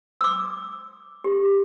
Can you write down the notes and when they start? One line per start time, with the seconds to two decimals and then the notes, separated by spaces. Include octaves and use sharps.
0.21 D6 E6
1.24 G4